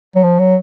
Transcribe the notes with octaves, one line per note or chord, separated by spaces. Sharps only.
F#3
F3
F#3